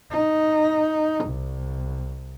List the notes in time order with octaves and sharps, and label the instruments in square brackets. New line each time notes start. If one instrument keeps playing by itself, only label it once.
[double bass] D#4
C2